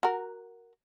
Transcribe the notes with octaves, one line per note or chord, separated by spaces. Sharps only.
F#4 A#4